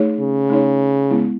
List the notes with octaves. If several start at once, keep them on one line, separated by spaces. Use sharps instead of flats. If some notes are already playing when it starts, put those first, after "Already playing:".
Already playing: A3 D#4 G#4 C#5
C#3
A3 D#4 G#4 C#5
G#3 B3 E4